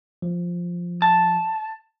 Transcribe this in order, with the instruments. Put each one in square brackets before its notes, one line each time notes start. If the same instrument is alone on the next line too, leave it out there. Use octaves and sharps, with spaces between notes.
[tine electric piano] F3
[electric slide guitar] A5